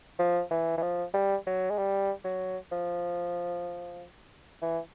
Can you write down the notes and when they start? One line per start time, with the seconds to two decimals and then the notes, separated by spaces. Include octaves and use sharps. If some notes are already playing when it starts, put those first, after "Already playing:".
0.19 F3
0.51 E3
0.78 E3
0.82 F3
1.14 G3
1.47 F#3
1.70 G#3
1.78 G3
2.25 F#3
2.72 F3
4.62 E3